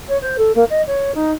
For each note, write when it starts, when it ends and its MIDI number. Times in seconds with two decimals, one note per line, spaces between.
0.09 0.20 73
0.21 0.36 72
0.38 0.52 69
0.55 0.64 58
0.70 0.82 75
0.87 1.12 73
1.15 1.32 63